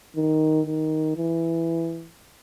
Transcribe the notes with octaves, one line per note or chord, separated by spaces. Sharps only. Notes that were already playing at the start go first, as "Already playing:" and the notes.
D#3
D#3
E3